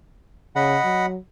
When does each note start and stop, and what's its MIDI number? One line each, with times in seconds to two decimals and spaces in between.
0.56 0.78 49
0.56 1.06 75
0.56 1.06 78
0.56 1.06 83
0.84 1.16 54